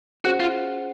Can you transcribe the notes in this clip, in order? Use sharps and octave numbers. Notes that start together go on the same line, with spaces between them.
C#4 F#4 G#4 C5 F#5
F4